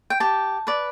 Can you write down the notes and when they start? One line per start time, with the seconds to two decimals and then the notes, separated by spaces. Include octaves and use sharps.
0.10 G5
0.20 G4 A5
0.67 B4 D5